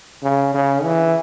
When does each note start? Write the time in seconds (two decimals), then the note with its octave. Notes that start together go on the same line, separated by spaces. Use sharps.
0.22 C#3
0.54 C#3
0.84 E3